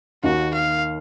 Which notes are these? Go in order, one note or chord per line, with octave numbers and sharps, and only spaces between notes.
D#2 D#3 A#3 F#4
F5